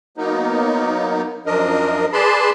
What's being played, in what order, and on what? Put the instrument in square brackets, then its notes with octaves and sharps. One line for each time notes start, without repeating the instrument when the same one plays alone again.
[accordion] F#3 A#3 B3 D#4
F#2 F3 D4 A#4 D#5
G#4 B4 D5 A5 B5 C6